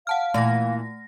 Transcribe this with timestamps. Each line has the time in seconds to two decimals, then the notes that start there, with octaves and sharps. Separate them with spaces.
0.07 F5 F#5 A5 F6
0.34 A#2 E3 A3 A#6